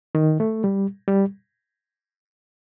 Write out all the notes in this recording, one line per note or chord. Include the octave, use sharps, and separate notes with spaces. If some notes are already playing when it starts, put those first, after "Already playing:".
D#3
A3
G3
G3